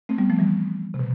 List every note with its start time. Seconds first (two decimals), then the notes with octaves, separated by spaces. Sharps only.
0.09 A3 C4
0.18 G3 B3
0.30 F3 A3
0.39 E3 G3
0.94 C3
0.99 B2